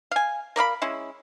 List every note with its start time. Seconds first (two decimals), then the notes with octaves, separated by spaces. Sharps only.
0.11 F5 G#5
0.56 A#4 D5 F5 B5
0.82 G#3 C#4 E4